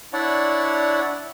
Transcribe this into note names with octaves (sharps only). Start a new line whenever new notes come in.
D4 E4 C#5 D5 F#5